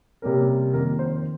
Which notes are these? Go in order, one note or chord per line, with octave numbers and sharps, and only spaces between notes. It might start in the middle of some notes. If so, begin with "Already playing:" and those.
C3 G3 A#3 C#4 A#4
F2 D#3 A#3 A#4
C5